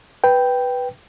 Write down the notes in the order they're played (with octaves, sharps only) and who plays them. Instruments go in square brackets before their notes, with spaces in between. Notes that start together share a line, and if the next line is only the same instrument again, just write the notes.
[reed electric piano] B4 G5